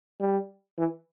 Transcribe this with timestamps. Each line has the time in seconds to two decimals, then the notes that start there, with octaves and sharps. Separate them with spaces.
0.20 G3
0.77 E3